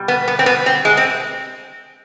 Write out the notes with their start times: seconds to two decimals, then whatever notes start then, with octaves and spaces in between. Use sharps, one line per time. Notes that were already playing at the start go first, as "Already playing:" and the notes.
Already playing: B2 G3
0.08 B3
0.28 B3
0.39 C4
0.46 B3
0.66 C4
0.85 G#3
0.97 C4